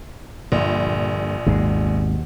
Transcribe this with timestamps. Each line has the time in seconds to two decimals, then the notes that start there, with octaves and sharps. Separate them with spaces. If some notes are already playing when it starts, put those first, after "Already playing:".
0.52 A#1 G2 D3
1.46 G#1 D#2 B2 G#3